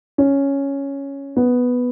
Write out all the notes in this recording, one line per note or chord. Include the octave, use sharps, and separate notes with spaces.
C#4
B3